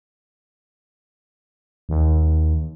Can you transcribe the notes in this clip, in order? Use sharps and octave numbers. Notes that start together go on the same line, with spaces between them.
D#2